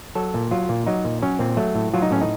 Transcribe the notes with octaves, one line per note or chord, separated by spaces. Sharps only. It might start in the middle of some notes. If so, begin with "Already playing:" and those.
F#3 A4
A#2
F#3 F4
A#2
F#3 D#4
A#2
F#3 C#4
A#2 C4
F#3 A3
A2
F#3 F4
D#4
A2 C#4
D#4